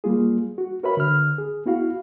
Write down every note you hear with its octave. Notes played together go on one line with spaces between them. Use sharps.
G3 A#3 F4 G#4
F#4
F#4 A#4 B4 C#5 E5 B5
D3 F6
G#4
B3 E4 F#4 F5